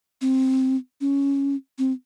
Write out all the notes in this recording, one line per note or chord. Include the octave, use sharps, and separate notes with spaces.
C4
C#4
C4